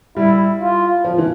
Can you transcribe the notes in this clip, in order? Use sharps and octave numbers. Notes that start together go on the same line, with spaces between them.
G3 E4
F4
F3
E3